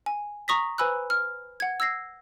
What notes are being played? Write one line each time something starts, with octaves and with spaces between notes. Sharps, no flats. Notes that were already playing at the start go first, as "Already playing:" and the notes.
G#5
A#5 C#6 D#6 A#6 B6
B4 C5 G#5 B5 E6 F#6
F6
F#5 G#6
E6 G#6 A#6 C7